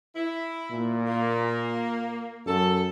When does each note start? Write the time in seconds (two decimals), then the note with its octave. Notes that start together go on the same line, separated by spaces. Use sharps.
0.14 E4
0.71 A#2
1.06 A#3
2.46 F#2 A4